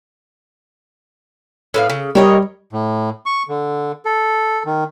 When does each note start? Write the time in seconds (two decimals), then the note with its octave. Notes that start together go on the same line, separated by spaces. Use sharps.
1.74 A2 B3 F5
1.90 C#3
2.15 G3 A#4 C#5 D#5
2.73 A2
3.26 C#6
3.48 D3
4.05 A4
4.66 D#3